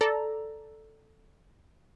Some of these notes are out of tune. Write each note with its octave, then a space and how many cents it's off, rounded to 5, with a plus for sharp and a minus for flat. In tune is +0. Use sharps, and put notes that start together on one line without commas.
A4 +0 D5 +0 A#5 +0